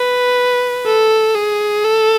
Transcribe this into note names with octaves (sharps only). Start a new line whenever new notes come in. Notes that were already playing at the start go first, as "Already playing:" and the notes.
Already playing: B4
A4
G#4
A4